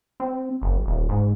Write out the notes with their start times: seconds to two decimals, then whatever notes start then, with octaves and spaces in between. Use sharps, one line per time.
0.20 C4
0.62 F#1
0.86 D#1
1.09 G#2